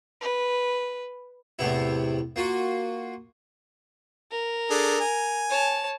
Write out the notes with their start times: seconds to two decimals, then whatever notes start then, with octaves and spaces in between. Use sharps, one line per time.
0.21 B4
1.59 E2 A2 C3 B3 E4
2.36 A#3 F4 F#4
4.31 A#4
4.70 D4 G#4 A4
5.00 G#5
5.50 C#5 A5